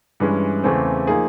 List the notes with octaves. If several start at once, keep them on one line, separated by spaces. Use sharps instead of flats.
G2 E3 G#3 C#4
E2 C#3 E3 A3 C4
F3 A#3 D#4 G#4